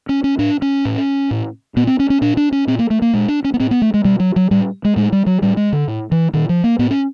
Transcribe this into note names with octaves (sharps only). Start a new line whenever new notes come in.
C#4
C#4
A2 D4
C#4
A2
A2
A#2 B3
C4
C#4
C#4
A#2 D4
D4
C#4
A#2 C4
A#3
A3
A#3
A#2 G#3
D4
C#4
B3
A2 C4
B3
A3
G#3
B2 G3
F#3
F#3
A2 G3
G#3
A2 G#3
G3
F#3
A2 G3
G#3
D3
A2
E3
A#2 D#3
F3
A#3
A2 B3
C#4